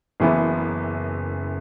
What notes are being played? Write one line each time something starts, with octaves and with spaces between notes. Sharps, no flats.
F#1 F#2 E3 B3 E4